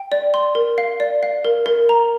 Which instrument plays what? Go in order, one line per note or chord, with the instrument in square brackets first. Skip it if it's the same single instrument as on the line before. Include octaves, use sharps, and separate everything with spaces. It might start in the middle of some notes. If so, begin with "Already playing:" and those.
Already playing: [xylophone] G5
D5
C6
A#4
F5
D5
F5
A#4
A#4
A#5